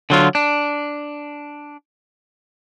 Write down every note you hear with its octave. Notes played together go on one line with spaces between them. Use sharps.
D3 F#3 F4
D4